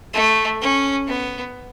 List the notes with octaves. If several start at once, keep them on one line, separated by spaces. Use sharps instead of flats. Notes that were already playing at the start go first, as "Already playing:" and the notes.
A3
C#4
B3